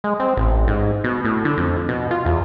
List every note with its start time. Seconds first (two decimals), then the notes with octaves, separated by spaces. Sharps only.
0.04 G#3
0.20 C4
0.37 A1
0.68 G#2
1.04 B2
1.25 A2
1.45 D3
1.57 F2
1.89 B2
2.11 F4
2.26 E2